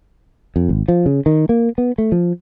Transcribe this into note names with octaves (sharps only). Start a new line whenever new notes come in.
F2
G#1
F3
C#3
D#3
A#3
B3
A3
F3